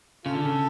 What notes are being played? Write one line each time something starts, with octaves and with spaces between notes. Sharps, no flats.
C#3 F4 A4
D3
C#3